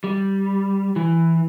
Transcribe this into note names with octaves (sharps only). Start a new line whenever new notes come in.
G3
E3